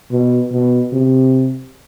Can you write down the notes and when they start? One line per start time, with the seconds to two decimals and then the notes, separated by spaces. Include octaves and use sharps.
0.11 B2
0.52 B2
0.93 C3